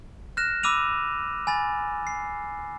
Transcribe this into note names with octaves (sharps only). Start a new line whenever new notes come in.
F6 F#6 A#6 E7
B5 D6 E6 D#7 F7
G#5 B5 A6
C7